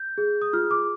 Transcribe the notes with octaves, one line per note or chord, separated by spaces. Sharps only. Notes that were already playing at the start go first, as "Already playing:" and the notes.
Already playing: G6
G#4
D#6
F4 F6
D6